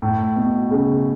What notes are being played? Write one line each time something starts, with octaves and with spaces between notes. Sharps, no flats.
A2
B2
C#3